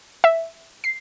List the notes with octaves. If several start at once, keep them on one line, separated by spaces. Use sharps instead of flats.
E5
C7